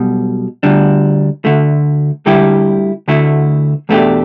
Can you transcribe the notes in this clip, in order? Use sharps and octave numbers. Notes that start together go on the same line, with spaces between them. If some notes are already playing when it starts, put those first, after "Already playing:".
Already playing: B1 B2 G3
D2 D3 G3 D4
D2 D3 A3
D2 D3 G3 E4 G4
D2 D3 A3 E4
E2 B2 A3 D4 G4